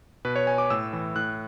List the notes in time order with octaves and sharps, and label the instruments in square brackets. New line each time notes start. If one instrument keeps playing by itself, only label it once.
[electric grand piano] B2 B4
C#5
G#5
D6
A2 E6
E3
A2 F#6